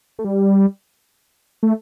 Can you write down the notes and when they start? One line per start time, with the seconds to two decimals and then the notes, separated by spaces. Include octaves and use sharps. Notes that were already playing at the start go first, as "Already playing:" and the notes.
0.19 A3
0.24 G3
1.63 A3